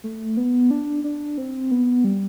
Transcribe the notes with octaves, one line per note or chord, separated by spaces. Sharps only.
A3
B3
D4
D4
C4
B3
G3